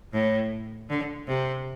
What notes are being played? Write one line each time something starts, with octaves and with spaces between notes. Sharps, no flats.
A2
D3
C3